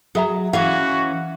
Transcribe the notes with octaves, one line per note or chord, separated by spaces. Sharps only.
F#3 G#4 E5 A#5
E3 C#4 F#4 F5